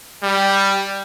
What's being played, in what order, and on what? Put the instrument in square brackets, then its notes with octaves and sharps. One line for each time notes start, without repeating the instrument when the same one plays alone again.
[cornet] G3